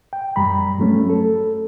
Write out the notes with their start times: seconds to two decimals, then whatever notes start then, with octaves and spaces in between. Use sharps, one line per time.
0.13 G5
0.36 F#2 G3 A#5 B5
0.78 G2 F#3 A3 C#4
1.10 A4